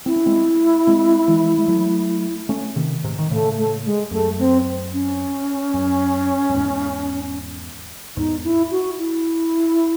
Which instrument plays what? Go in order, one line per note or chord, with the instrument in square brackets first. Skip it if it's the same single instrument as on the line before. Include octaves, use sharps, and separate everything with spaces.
[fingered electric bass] C4 [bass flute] E4
[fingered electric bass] C#4
G#3 C4
G#3 C4
E3 G#3
G#3
F#3 A3
A3 C#4
C3 D#3
G#2 C3
D#3
[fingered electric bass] A2 C#3 [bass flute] A3
[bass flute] A3
G#3
[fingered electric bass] F#2 [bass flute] A3
[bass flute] C4
C#4
[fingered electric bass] F#2
F#2
E2 G#2
[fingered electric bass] E2 G#2 [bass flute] D#4
[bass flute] E4
F#4
E4